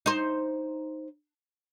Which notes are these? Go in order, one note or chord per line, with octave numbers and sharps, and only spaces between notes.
D#4 C5